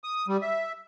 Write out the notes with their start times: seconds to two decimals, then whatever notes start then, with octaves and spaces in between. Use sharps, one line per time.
0.04 D#6
0.28 G3
0.42 E5